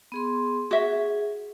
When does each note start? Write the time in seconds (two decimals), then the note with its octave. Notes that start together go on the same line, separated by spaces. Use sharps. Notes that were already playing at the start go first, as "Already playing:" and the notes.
0.12 B3 G#4 C6
0.71 F#4 G#4 E5